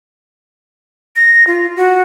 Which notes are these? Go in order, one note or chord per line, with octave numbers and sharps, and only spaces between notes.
A#6
F4
F#4